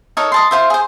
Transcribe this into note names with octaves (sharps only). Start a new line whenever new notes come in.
D#4 A4 A#4 C#5
D#5 A5 C6
F4 C5 E5
G#4 C5